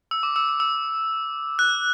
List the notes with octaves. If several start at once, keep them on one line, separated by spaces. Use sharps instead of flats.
E6
D6
E6
D6
E6
F#6